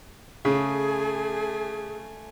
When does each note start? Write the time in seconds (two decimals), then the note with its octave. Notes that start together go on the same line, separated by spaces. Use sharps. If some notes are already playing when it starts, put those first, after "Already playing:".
0.45 C#3 A3 G#4 G#5